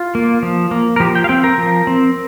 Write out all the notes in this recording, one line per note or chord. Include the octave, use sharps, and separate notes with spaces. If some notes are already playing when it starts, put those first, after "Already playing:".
Already playing: F4
A#3
F3
A#3
A#4
F3 G4
G5
F5
C4 G5
A#4
F3
C4